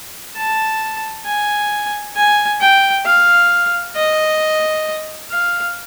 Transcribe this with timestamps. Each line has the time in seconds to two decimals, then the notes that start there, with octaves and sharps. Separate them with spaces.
0.36 A5
1.25 G#5
2.16 G#5
2.61 G5
3.06 F5
3.96 D#5
5.31 F5